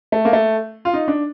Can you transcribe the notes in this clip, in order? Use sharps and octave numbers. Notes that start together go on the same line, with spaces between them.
A3
A#3
A3
F4
D#4
D4